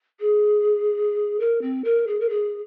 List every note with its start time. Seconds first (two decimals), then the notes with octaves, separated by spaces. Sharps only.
0.20 G#4
1.40 A#4
1.62 C4
1.84 A#4
2.07 G#4
2.20 A#4
2.29 G#4